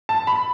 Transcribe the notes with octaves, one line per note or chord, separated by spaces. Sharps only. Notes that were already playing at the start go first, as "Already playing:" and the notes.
A5
B5